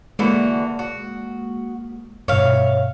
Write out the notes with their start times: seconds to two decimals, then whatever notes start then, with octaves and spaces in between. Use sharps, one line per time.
0.19 D3 E3 G#3 A#3 F#4
0.79 F#4
2.28 G2 B2 C#5 E5 F5